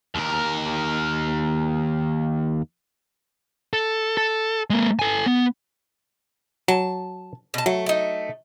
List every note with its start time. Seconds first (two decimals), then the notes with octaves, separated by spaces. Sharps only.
0.15 D#2 A#4
3.73 A4
4.17 A4
4.70 G#3 A#3
4.99 A4 G#5
5.26 B3
6.68 F#3 A5
7.54 B2 A5
7.66 F#3 A3
7.86 A3 D#4